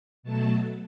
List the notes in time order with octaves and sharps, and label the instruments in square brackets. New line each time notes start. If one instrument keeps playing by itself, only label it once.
[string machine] B2 F#3 A3 A5